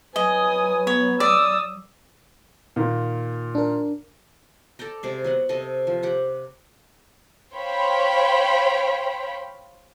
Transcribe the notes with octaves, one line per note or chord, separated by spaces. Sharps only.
F#3 B4 D#5 G#5 D#6
B3 C#5
D5 D#6 E6
A#2 D#3 A#3
D4 A#4
A4 D5 G5 A#5
C3 G#3 D5
F#3 B3 F#5
C3 A4 D#5
F3
G4 F#5 A#5
C5 C#5 F5 G5 B5